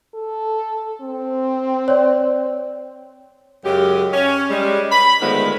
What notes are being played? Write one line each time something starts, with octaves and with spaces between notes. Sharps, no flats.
A4
C4
C#5 D5
F#2 C#3 G#3 G4
C#4
G3 G#3
B5
D3 D#3 F3 G#3 A3 B3